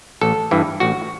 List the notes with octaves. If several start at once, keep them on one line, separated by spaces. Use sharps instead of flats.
A1 A4
G2 E3
A1 F#4